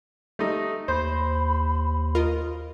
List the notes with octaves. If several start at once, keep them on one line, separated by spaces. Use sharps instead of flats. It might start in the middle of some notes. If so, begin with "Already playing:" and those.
G3 A3 D#4
D#2 C5 B5
F4 A#4 D#5